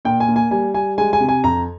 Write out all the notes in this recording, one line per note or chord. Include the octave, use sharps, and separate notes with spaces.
A#2 G5
G#5
A#3
G#5
G3 G#5
G3 G#5
G#3 G#5
G#5
C3
G#5
F2 A#5